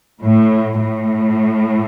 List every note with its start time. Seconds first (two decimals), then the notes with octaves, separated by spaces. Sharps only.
0.22 A2
0.79 A2